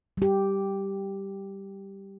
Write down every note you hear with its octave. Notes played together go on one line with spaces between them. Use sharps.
G3 G4